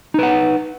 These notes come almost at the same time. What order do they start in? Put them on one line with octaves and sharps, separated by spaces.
D#4 B4 F#5